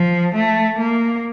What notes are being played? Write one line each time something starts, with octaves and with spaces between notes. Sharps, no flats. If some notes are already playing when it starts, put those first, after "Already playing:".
Already playing: F3
A3
A#3